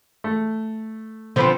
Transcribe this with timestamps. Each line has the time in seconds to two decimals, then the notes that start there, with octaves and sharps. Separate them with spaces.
0.24 A3
1.36 D3 F3 C4 B4 C5